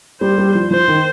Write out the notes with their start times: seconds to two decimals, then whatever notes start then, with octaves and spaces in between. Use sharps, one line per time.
0.21 G3 C5
0.38 G3
0.55 F3
0.71 F3 C5
0.88 D#3